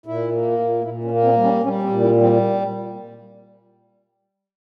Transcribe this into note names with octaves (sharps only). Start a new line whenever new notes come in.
A#2 E4
A#3
A#2
A#2 E4
C#4
A#3
C4
G3
C#4
G3 C#4
C4
A#2
E4
G3
C4